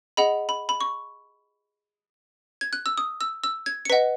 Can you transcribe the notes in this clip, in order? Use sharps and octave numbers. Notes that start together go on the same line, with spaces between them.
G#4 D#5 F#5 B5
B5
B5
C#6
G#6
F#6
E6
D#6
E6
E6
G#6
C#7
B4 D#5 F#5 B6